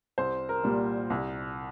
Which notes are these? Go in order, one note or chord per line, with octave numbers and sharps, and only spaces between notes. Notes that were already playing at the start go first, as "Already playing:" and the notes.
C2 C5
A#4
A#2 G3
C2